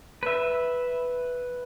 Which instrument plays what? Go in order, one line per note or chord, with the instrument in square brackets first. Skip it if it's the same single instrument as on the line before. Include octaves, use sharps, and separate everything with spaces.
[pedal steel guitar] B4 E5